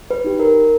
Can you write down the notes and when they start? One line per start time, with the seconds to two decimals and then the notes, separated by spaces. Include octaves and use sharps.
0.11 B4
0.24 D#4 G4
0.40 A#4